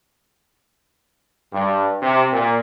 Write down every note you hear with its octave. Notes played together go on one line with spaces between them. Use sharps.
G2
C3
A#2